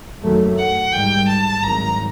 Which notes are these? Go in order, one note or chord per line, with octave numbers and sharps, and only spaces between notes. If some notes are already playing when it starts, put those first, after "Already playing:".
F#2 D#3 F#3 A3
F#5
G#2 D#3 G3 G5
A5
G#1 G2 D#3 F#3 A#5